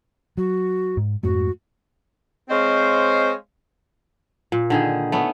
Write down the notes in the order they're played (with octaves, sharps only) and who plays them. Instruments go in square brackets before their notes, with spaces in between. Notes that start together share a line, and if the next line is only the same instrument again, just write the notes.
[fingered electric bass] F#3 [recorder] F#4
[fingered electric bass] G#2
[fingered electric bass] F2 G#2 A3 [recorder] F#4
[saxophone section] G#3 C4 C5 C#5 D#5 F5
[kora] A#2
D3 D#3 G#4
A3 B3 C#4